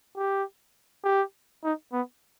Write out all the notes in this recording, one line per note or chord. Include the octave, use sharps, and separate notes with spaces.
G4
G4
D#4
B3